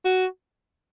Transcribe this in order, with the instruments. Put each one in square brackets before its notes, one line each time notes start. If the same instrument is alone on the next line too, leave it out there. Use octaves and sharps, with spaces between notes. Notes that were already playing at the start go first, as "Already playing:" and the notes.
[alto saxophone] F#4